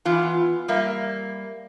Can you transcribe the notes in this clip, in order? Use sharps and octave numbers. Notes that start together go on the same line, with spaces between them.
E3 B3 F4
G3 A#3 E5